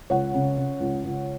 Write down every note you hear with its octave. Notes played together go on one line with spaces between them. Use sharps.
C#2 C#5 F#5
C#3
C#3
C#2
C#2